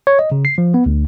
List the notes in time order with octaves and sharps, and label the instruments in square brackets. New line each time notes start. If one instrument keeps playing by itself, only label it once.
[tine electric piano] C#5
D#5
C#3
C7
F3
B3
D2